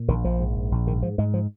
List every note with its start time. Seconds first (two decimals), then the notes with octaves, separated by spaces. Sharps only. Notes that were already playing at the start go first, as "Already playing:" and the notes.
Already playing: A#2
0.08 A#1 D#3
0.24 A#1 F3
0.40 G#2
0.56 A#1
0.72 A#1
0.87 G#2 D#3
1.03 G#2 F3
1.18 G#2 G#3
1.34 F3